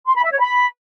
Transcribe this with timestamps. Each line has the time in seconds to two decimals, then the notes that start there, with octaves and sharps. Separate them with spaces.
0.07 C6
0.16 B5
0.24 E5
0.32 C#5
0.40 B5